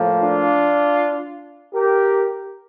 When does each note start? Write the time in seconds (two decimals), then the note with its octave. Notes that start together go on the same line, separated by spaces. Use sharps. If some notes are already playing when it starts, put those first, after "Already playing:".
Already playing: A2 F3 A#3
0.21 D4 F4
1.73 G4 A#4